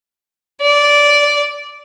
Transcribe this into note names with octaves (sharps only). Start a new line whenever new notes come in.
D5